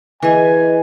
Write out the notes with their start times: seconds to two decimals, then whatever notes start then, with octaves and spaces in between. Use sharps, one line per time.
0.22 E3 G#4 B4 D#5 E5 G#5